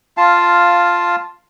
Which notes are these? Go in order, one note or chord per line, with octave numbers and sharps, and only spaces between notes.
F4 F5 A5